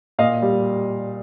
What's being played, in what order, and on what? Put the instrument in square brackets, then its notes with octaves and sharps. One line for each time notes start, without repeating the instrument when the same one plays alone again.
[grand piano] A#2 D#5 F5
G3